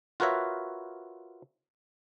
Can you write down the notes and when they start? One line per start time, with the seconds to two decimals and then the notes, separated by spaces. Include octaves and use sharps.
0.20 F4 F#4 A#4 B4 C#5 E5